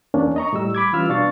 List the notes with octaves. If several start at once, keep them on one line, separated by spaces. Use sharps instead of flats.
E2 A#3 C#4 D4
D#5 A#5 C#6
A2 G3 E6
B5 D6 G#6
E3 G3 C#4 F4 E6 F6
B2 D4 F5 C#6 A6